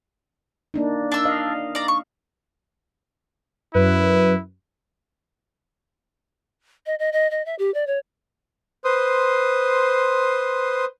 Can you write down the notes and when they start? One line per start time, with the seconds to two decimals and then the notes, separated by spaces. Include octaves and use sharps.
0.74 A#3 D4 D#4
1.12 D4 E6
1.25 D#5 F5
1.75 D5 A#5
1.88 C#6
3.75 F#2 E4 B4
6.86 D#5
6.99 D#5
7.13 D#5
7.31 D#5
7.46 E5
7.59 G4
7.74 D5
7.87 C#5
8.84 B4 C5 C6 D#6